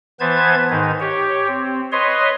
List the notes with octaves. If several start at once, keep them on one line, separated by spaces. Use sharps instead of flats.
E3 B3 B4 C5 A5 G#6
G#2 D#3 D#4
G4 C#5
C4
B4 C#5 D#5 C6